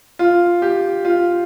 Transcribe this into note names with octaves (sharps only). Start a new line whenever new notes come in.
F4
G4
F4